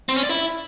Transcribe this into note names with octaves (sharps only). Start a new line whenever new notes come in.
C4
C#4
D5
E4